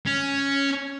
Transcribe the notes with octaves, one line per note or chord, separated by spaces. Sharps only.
C#4